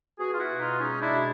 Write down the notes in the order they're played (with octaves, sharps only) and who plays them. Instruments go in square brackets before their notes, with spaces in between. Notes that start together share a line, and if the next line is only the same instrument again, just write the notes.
[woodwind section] B3 F#4 G#4
F4
E4 F#4
B2
D#4 F4
G#3 C#4 D#4
D4 E4
B2